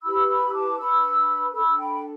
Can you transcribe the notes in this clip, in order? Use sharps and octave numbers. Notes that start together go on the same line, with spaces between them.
E4 G4 B4 B5 E6
B5 E6
E6
A5 D6
D4 B4 B5 E6
A4 B5 E6
D4
G5 B5